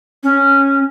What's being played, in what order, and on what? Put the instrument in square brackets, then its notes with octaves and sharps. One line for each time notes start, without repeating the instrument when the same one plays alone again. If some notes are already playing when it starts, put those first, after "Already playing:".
[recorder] C#4